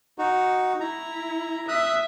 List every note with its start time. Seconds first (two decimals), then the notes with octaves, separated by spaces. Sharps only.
0.18 D#4 F#4
0.80 E4 A#5
1.68 E5 D#6 F#6